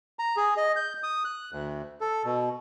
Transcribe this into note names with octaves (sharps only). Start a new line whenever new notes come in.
A#5
G#4
D#5
G6
D#6
F#6
D2
A4
B2